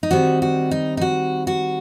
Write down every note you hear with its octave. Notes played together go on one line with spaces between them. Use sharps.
D#4
D#3 G3 C4 F#4
F#4
D#4
D#4
F#4
F#4